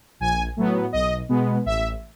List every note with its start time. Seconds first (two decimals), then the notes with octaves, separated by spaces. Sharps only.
0.20 A#1 G#5
0.57 A2 F#3 B3
0.93 B1 D#5
1.29 B2 G#3 B3
1.66 A1 E5